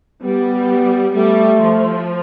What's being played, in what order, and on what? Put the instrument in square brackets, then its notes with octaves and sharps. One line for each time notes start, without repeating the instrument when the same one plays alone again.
[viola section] G3 [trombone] B3
[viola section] G3 [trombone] A3
[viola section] F3